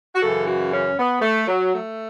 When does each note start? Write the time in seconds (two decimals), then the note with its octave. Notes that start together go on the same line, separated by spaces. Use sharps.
0.15 F#4
0.22 F#2 C#3 E3 A4
0.48 F#4
0.72 C#4
0.98 B3
1.22 A3
1.48 F#3
1.72 A3